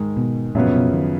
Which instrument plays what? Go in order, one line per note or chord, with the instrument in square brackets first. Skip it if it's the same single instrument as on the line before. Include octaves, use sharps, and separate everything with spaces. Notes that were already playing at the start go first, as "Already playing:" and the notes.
Already playing: [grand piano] G#2 D#3 G#3
[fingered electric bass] B2
[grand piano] F#2 C#3 F3 B3 [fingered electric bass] A#2
[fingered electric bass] B2
D#3